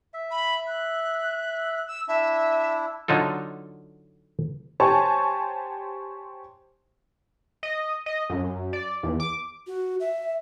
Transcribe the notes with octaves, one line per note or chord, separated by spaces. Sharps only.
E5
B5
F#6
E6
D4 E4 E5
D3 F#3 D#4 F4 A4
G4 C5 C#5 G#5 A5 C#6
D#5
D#5
F#2
D5
E2
D6
F#4
E5